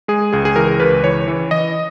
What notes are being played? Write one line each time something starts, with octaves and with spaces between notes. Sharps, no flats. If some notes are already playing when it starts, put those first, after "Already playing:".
G#3 G#4
C#2 G#4
G#4
E3 A#4
C#2 B4
E3 C#5
E3
E3 D#5